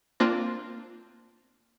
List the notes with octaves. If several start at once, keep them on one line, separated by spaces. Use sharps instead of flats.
A#3 C4 D4 F4